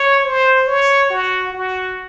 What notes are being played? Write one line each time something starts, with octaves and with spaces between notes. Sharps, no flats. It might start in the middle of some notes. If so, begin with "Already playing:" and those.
Already playing: C#5
C5
C#5
F#4
F#4